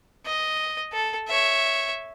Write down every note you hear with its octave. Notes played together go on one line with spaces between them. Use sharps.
D#5
A4
C#5 E5